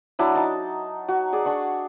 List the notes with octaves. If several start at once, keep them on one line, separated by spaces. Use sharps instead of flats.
F#3 D4 E4
D#4 A5
F#4
G#4 D5
D4 F#5 C#6